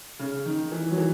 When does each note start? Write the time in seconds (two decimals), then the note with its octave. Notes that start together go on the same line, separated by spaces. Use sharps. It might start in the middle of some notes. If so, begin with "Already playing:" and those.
0.19 C#3
0.46 D#3
0.72 E3
0.91 F#3
0.98 E3